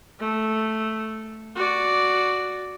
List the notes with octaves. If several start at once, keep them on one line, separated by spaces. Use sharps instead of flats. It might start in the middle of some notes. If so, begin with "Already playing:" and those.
A3
F#4 D5